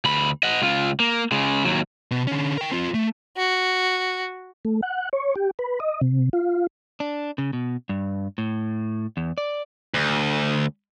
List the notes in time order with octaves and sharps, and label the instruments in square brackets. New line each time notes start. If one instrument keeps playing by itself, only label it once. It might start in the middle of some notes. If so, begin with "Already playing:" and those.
[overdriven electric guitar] D2 B5
D#5 F#5
C#2 F4
A#3
C#3 G#3
D#2 F#3
[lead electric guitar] B2
D3 C#4
A#4 G5
C4 F4
A3
[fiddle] F#4
[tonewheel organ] A3
F#5
C#5
G4
B4
D#5
C3
F4
[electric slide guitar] D4
C#3
B2
G2
A2
E2
D5
[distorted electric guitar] D2